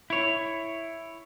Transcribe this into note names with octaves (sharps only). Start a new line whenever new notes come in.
E4 C#5